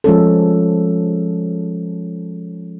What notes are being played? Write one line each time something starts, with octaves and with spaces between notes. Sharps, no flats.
F3 G#3 C#4 A4